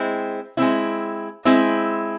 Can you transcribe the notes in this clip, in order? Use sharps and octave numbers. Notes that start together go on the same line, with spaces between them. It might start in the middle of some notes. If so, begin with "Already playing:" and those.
Already playing: G#3 C4 E4
G#3 C4 E4
G#3 C4 E4